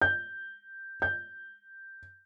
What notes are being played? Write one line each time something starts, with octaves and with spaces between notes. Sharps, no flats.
G6
G6